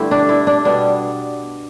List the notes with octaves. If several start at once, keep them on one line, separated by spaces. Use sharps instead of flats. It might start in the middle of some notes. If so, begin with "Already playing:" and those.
Already playing: G2 D3 A3 E4 G4 A4
D4
E4
D4
B2 G3 B3 D4